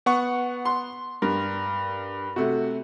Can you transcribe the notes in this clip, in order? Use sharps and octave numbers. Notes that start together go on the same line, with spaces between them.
B3 F#5 C#6
C6
G2 A#4
C3 A3 F#4